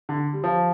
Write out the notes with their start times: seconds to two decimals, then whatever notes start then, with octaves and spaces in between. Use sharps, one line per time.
0.09 D3
0.33 G3
0.44 F3